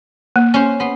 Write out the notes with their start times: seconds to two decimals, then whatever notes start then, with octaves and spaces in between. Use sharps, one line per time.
0.36 A#3
0.54 C#4 C5
0.80 B3 C6